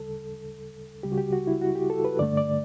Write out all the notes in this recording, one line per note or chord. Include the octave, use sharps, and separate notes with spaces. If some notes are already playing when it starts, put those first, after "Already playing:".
Already playing: D2 C#3 G3 A4
C#2 C#3 G3 G4
F#4
G4
F#4
E4
F#4
G4
A4
B4
G2 D3 A3 D5
D5